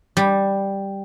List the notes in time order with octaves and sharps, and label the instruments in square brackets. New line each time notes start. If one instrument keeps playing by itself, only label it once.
[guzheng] G3